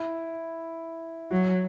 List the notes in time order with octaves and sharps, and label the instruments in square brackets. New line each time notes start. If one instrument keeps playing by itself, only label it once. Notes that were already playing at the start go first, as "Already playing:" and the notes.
Already playing: [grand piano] E4
[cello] F#3 [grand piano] F#4